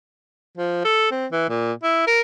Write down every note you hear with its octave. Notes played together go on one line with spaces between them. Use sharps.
F3
A4
C4
E3
A#2
E4
A#4